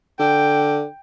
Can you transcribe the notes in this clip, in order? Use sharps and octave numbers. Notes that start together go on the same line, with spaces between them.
D3 G5